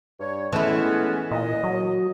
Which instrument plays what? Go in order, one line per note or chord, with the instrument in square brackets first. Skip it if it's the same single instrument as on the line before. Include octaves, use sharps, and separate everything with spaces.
[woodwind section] G2 C#5
[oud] E3 E4 [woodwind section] G#3 B3 C#4 [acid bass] A3
[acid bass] A#2 [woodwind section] D#5
[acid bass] F#3